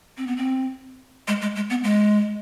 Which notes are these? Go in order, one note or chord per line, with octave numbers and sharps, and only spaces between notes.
C4
B3
C4
G#3
G#3
G#3
B3
G#3